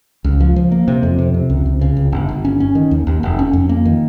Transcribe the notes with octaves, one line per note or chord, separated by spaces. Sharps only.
C#2
F3
F3
A#3
C3
F2
C3
C3
C#2
C#2
C#3
C#2
G1
G1
C#4
C#4
D#3
D#2
D#2
F1
C#4
F2
A#3
D#3